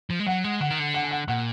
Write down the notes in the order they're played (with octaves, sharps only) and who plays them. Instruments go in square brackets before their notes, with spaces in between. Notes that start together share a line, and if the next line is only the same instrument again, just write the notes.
[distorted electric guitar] F3
G#3
[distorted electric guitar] F#3 [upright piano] F#5
[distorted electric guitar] G#3
[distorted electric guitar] D3 [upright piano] F#5
[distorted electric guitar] D#3
D3
[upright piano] F#5
G#5
F#5
[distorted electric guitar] A#2 [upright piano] F#5